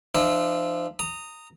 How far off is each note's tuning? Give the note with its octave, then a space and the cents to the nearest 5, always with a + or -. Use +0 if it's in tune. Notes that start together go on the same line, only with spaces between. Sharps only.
F3 -20 D4 +45 E5 -10
A#5 -20 D#6 +0